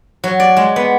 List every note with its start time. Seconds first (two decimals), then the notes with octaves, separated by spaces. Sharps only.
0.24 F#3
0.40 D5
0.57 G#3
0.76 B3